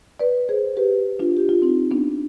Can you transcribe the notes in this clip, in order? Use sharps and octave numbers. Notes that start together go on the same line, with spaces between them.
B4 D5
G#4 C5
G4 B4
D4 F4
G4
F4
C4 D#4
B3 D4